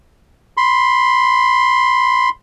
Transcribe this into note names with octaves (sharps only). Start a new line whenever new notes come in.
B5 C6